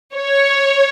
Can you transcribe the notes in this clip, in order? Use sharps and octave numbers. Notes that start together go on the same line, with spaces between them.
C#5